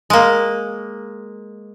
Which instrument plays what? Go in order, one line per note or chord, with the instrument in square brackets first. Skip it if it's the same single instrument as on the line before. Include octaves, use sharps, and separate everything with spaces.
[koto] G#3 A#3